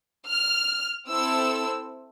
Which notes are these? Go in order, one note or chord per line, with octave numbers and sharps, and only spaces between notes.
F6
C4 E4 A4 E6